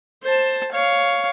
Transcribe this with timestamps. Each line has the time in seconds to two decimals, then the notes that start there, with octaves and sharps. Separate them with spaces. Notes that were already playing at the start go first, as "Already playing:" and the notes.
0.24 C5 A5
0.72 C#5 F5